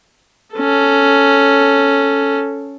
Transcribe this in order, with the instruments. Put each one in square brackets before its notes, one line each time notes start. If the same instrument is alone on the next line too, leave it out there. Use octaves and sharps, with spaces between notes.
[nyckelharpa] C#4 A4